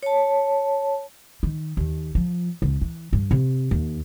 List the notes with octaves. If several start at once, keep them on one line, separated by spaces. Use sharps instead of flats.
C#5 A5
D#3
D#2
F3
C#2
E3
G2
C3
D#2